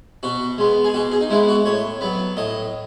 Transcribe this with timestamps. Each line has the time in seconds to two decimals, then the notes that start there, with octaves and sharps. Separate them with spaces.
0.23 B2 F#4
0.58 G#3 B3
0.84 G#4
0.94 B2 F#4
1.12 G#4
1.21 D#4
1.30 G#3 B3 E4
1.48 F#4
1.66 A2 C#5
2.01 F#3 B3
2.37 A2 D#5